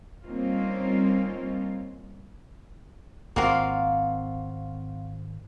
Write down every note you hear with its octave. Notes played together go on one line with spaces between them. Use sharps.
G3 A#3 C4 C#4 D#4 F4
G#1 A#3 C4 F4 F#4 A#4 F5